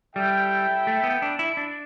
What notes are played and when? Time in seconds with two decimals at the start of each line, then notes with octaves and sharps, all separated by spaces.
0.16 G3 E4 A4 E5 G5
0.87 A3
1.04 B3
1.22 D4
1.39 E4
1.57 D4